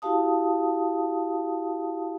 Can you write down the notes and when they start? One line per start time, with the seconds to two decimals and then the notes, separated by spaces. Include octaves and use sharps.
0.02 E4 F#4 G4 F5 A5 D#6